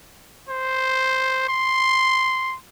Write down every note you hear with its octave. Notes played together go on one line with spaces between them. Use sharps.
C5
C6